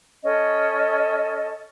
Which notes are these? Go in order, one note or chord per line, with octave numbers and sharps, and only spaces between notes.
C#4 A4 D#5